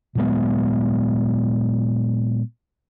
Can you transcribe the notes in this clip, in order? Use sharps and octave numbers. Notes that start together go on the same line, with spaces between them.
A#2 F#3 G#3 B3